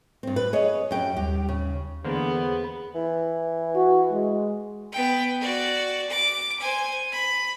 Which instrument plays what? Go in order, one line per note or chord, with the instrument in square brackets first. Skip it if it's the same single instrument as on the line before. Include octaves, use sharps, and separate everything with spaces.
[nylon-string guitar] G2 C4
B4
G#4 C#5 D#5
F#2 G5
[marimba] D#2 G3 [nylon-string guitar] G4
[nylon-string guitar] C#3
[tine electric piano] E2 C5 [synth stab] D3 A#3 D4 [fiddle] B3 [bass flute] G#4
[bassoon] E3
[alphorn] F#4
G#3
[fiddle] B3 G5
F#4 D5
D6
C5 G#5
B5